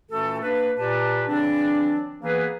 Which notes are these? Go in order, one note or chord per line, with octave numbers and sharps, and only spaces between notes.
A#2 E3 A3 C#4 F#4 A4
A#3 D4 B4
A#2 G4 B4 A5
C#3 E3 F#3 C4 D4
E3 A#3 B3 G#4 B4